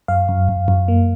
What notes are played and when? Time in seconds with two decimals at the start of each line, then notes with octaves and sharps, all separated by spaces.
0.08 F#2 F5
0.29 F#2
0.49 F#2
0.68 F#2
0.88 A#3